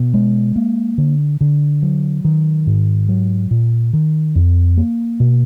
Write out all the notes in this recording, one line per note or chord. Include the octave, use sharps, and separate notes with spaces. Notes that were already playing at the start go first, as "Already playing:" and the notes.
Already playing: B2
G#3
A#3
D3
D3
F#3
D#3
G#2
F#3
A#2
D#3
F2
A#3
B2